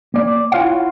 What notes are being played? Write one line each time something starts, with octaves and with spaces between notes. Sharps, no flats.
A#3 D5
E4 F4 C#5 F5 F#5